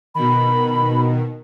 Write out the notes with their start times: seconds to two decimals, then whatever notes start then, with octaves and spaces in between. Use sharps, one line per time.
0.15 B2 D#3 B5